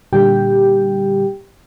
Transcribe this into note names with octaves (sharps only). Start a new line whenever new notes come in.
A#2 D3 G3 G4 G5